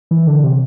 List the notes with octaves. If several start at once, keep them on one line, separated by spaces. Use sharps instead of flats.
E3
D3
C3